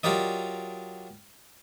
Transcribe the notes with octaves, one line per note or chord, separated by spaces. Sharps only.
F#3 F4 G4 A#4 D5 D#5